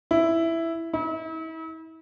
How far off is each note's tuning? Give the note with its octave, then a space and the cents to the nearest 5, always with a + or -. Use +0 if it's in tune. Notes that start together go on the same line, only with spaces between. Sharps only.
E4 +5
E4 -40